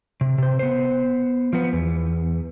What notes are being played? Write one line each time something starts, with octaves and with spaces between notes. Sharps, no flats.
C3
C3 C5
B3 C5
F3 B3
E2